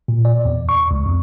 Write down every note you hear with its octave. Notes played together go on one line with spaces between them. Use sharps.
A#2
D5
E2
C#6
C#2
F2